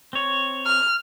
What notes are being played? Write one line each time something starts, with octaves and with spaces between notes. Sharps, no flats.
C4 C#5
F6